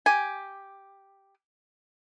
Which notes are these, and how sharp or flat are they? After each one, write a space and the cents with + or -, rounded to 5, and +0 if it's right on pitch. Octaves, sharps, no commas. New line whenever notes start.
G4 +0 G#5 +0